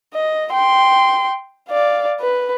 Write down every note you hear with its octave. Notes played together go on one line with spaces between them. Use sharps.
D#5
G5 C6
D5 F5
B4